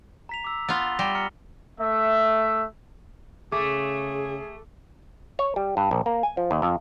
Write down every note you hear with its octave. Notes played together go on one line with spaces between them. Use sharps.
A#5 B6 F7
D6 E6
B3 F4 A6 F7 G7
G3 A#6 B6 G7
A#5 F6 C#7
A3 E5
C#3 A3 G#4 D6
C#5
G3
G2
A#1
A#3
G#5
F3
D#2
F2